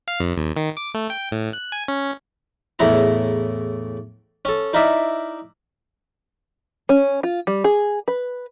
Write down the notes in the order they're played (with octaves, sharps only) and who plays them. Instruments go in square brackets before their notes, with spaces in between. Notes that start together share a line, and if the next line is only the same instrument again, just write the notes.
[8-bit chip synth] F5
F2
D#2
D#3
D6
A3
G5
A2
F#6
G#5
C#4
[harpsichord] E2 A2 C#3 E4 A#5
C#4 A4
D#4 E4 A#4 D5 E5
[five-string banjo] C#4
F4
G3
G#4
B4